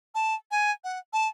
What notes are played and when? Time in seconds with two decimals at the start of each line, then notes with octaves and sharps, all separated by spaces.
0.15 A5
0.51 G#5
0.84 F#5
1.13 A5